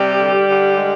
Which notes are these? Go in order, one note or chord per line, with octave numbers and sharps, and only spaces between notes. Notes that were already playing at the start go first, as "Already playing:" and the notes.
Already playing: C3 G3 G4
D3
D3
G#3